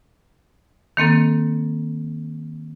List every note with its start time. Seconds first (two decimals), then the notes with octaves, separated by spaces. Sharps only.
0.97 D#3 A#3 C4 A4